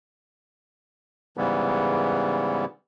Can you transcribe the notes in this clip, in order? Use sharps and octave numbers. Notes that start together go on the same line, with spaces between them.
G#2 C#3 E3 G3 B3